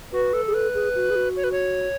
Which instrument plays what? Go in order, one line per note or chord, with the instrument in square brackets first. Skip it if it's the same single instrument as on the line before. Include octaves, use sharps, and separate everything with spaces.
[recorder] F#4 [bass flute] B4
[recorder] A4
[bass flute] G#4
[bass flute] A4 [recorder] B4
[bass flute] G#4
F#4
G#4
F#4
[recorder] C#5
B4
C#5